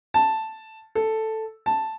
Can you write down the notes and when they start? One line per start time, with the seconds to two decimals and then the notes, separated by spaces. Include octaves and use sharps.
0.14 A5
0.95 A4
1.66 A5